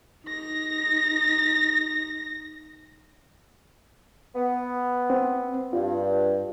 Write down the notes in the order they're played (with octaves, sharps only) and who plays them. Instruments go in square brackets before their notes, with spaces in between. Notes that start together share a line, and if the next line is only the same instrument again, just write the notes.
[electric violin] D#4 A#6
[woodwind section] B3
[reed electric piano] C4
[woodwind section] G2 [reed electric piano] F4